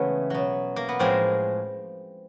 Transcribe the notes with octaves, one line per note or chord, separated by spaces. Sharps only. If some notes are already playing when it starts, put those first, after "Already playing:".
Already playing: C#3 E3 G#3 A3 B3
B2 F#3
A#3
B3
A2 F3 G#3 A#3 C4